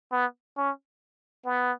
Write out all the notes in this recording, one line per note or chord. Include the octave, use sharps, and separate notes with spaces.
B3
C#4
B3